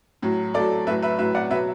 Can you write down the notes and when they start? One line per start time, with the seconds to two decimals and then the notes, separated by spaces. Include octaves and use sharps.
0.22 A2 F#3
0.54 A2 F#3 A4 D5
0.87 A2 F#3 B4 E5
1.03 B4 E5
1.18 A2 F#3 B4 E5
1.35 D5 F#5
1.50 B2 F#3 B4 E5